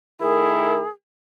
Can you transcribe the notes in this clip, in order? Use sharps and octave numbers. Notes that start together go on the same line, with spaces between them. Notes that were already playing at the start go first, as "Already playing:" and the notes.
D#3 A3 E4 G#4 A#4